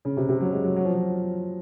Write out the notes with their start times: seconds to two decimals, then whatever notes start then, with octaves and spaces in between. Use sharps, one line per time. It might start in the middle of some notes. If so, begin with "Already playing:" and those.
0.05 C#3
0.17 C3
0.29 C3
0.41 F#3
0.52 G#3
0.64 F#3
0.76 F#3
0.85 F3
0.94 F#3